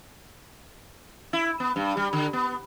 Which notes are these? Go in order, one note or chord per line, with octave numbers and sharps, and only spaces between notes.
E4
B3
G2
G3
D3
B3